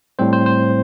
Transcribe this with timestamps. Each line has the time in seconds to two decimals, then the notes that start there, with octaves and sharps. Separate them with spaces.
0.19 A2 G3 C4 C5
0.33 C5
0.46 C5